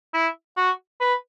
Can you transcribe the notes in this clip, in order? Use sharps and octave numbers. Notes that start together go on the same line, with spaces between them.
E4
F#4
B4